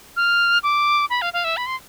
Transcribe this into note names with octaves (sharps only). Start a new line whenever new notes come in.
F6
D6
B5
F5
F5
E5
B5
C6